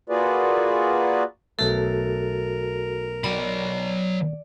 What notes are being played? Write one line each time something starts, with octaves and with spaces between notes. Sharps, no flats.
A#3 F4 F#4 G#4 B4 D5
B1 A3 F#4 A4 A#4
F#3 D5 B5